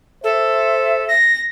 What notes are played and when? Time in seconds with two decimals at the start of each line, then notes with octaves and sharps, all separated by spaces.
0.24 A4 C5 E5
1.10 A#6